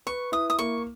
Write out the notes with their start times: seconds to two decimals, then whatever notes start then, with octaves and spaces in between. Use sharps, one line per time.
0.06 B4 C#6
0.32 E4 D#6
0.50 D#6
0.59 A#3 C#6